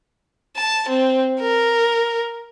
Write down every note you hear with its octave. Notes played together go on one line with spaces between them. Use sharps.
A5
C4
A#4